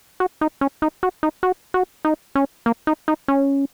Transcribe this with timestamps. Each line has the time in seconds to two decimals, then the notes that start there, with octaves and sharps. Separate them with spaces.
0.20 F#4
0.41 D#4
0.61 C#4
0.82 D#4
1.03 F#4
1.23 D#4
1.43 F#4
1.74 F#4
2.05 D#4
2.35 C#4
2.66 A#3
2.87 D#4
3.08 D#4
3.28 C#4